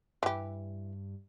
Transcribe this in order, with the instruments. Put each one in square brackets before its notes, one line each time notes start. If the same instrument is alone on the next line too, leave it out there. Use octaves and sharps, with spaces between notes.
[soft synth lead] G2 [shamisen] E3 G4